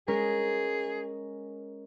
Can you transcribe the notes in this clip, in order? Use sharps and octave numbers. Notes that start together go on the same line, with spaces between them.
G#3 C#4 G#4 A#4